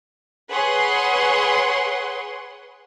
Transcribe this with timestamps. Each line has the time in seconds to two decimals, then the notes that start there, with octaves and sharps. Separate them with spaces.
0.50 G#4 B4 C#5 F#5 C6